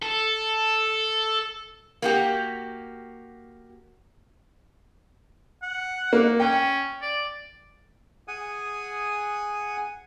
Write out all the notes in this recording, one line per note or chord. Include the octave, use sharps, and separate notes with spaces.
A4
A#3 F#4 G4
F#5
A#3
C#4 G5
D5
G#4 F#5 G#5 D#6